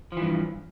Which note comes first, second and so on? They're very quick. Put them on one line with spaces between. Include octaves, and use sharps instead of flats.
F3 E3 G2